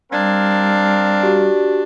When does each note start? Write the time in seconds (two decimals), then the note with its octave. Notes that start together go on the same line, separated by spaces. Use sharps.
0.12 G3 C4 D4 A#4 F5 G#6
1.23 F#4 G4